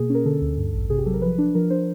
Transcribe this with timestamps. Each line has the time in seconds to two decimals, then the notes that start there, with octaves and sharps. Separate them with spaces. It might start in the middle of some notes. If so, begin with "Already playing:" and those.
Already playing: B2 A#3 G#4
0.10 C#4 A#4
0.25 D3 A4
0.41 D2
0.57 G2
0.74 A1
0.90 C3 G#4
0.98 G4
1.06 F#3 A4
1.14 A#4
1.22 F3 B4
1.38 D4
1.55 F3 A#4
1.70 D4 C5